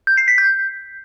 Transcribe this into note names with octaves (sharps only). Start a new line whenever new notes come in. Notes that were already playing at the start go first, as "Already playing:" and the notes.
G6
C7
B6
G6